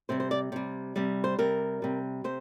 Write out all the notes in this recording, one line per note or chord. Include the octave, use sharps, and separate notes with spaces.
C3 G3 C5
C5
D5
C3 G3
C3 G3
C5
C3 G3 A#4
C3 G3
C3 C5